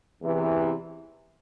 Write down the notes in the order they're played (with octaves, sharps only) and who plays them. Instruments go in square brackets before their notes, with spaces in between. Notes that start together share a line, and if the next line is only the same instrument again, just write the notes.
[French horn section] E2 C3 E3